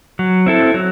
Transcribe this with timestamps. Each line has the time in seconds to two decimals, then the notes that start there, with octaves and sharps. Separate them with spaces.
0.19 F#3
0.46 C4 E4 A4
0.74 F#3